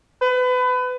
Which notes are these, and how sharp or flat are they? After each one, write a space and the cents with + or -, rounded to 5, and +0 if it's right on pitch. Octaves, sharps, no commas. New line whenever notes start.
B4 +30